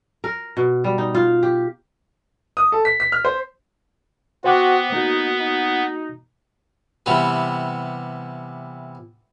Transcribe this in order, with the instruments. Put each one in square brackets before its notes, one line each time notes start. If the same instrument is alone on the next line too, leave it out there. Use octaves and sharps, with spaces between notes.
[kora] A#4
B2
G3
D#4
F4
G4
[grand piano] D#6
A4
B6
B6
F6
C5
[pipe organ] B3 [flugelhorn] F#4 [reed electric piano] C5 G5 D6
[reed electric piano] A#3 F#4 [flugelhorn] D#4
[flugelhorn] D#4
[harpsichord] C3 E3 G3 B3 B4